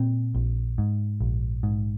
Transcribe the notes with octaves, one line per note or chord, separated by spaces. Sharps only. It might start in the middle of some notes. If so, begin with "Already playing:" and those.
Already playing: A#2 C4
A#1
G#2
A#1
G#2